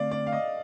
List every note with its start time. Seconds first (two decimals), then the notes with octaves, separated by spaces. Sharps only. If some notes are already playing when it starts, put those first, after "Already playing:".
Already playing: D3 A3 C4 D5 F5
0.11 D5
0.27 F5
0.32 D#5